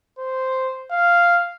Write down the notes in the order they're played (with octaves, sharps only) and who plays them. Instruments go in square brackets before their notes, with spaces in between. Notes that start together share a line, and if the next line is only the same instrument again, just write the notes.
[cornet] C5
F5